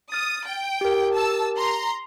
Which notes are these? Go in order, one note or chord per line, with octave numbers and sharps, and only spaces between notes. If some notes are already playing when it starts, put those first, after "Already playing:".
D#6 F6 A6
G5
G4 A#4
A5 E6
A#5 C6